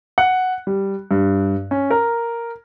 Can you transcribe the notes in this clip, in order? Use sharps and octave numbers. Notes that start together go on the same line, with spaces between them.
F#5
G3
G2
C#4
A#4